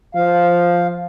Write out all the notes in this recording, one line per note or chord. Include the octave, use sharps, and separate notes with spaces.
F3 F5